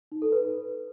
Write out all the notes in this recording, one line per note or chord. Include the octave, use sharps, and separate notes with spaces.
D#4
A4
B4